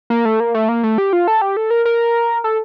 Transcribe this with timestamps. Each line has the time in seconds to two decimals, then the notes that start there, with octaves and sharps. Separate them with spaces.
0.10 A#3
0.25 A3
0.40 A#3
0.54 A3
0.69 A#3
0.83 A3
0.98 G4
1.13 F4
1.28 A4
1.42 G4
1.57 A4
1.70 A#4
1.85 A#4
2.44 A4